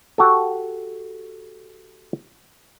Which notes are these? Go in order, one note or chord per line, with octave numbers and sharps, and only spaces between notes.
F#4 G4 A4